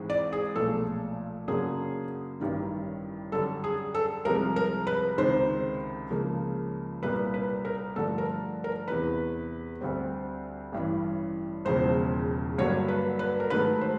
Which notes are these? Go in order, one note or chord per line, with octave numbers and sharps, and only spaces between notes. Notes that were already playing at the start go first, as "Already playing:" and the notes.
Already playing: G#1 G#2 E3 G#3 C4
D5
G#4
B1 A#2 F3 A3 A4
F#2 C#3 F#3 A#3 D4 G#4
A1 G2 D#3 G3
F#2 D3 G3 A4
G#4
A4
C2 C3 F3 G#3 A#4
A#4
B4
C#2 C3 D#3 C5
C#2 C#3 F3 A#3
C2 A#2 G3 A#3 B4
B4
A#4
G2 D3 F3 A3 A4
A#4
A#4
E2 C3 E3 B4
D2 D3 G3 C4
A1 G2 E3
E1 E2 C#3 F3 C5
G2 D3 F#3 A#3 C#5
B4
B4
A#4
G#2 D#3 F#3 A3 B4
C5